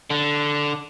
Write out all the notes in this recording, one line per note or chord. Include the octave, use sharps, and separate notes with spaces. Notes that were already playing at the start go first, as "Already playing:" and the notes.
D3